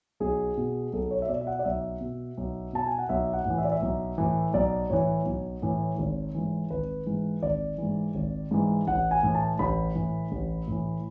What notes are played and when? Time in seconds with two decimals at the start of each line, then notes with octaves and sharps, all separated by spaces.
0.20 B1 G#4
0.57 B2
0.93 B1 A4
1.11 C#5
1.22 E5
1.28 B2 D5
1.41 E5
1.47 F#5
1.59 D5
1.65 B1 E5
2.01 B2
2.37 B1
2.73 B2 A5
2.87 G#5
2.98 F#5
3.09 B1 E5
3.33 F#5
3.45 A2 E3
3.58 E5
3.65 D5
3.72 E5
3.82 B1
4.18 A2 E3
4.54 B1 D5
4.90 A2 E3 C#5
5.26 B1
5.62 A2 E3
5.98 G#1
6.34 G#2 E3
6.70 G#1 B4
7.06 G#2 E3
7.43 G#1 D5
7.78 G#2 E3
8.15 G#1
8.51 G#2 E3
8.87 A1 F#5
9.11 G#5
9.23 A2 E3
9.35 A5
9.59 A1 B5
9.95 A2 E3
10.32 A1
10.67 A2 E3